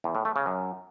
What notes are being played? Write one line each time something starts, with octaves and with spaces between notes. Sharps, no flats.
E2
A2
A3
C#3
F#2